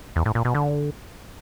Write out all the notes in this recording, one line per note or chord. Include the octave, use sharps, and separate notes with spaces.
E2
A2
A#2
B2
D3